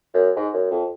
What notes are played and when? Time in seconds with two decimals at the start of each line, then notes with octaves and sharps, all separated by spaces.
0.14 F#2
0.36 G#2
0.54 F#2
0.71 F2